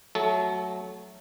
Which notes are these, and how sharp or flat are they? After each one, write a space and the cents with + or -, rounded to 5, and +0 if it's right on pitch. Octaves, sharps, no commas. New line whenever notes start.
F#3 +0 A3 +0 A4 -30